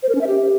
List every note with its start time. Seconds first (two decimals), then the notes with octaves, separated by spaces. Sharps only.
0.03 C5
0.09 A#4
0.15 C#4
0.21 E5
0.27 G4